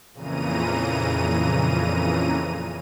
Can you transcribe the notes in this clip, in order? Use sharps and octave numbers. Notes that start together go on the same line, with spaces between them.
F2 A#2 C#3 E3 A#5 D#7